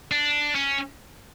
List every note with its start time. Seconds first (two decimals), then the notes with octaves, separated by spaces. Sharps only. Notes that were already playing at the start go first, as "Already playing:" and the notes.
0.11 D4
0.55 C#4